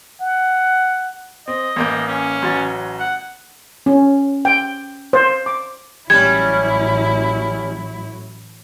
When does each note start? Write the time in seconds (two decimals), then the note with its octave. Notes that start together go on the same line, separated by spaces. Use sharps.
0.21 F#5
1.48 C4 D#5
1.76 A1 A#3 G6
2.07 C#4
2.42 A1 F#3 A6
2.99 F#5
3.86 C#4
4.45 G5
5.13 C5
5.46 D6
6.10 A1 F#3 G3 C#4 E4 G#6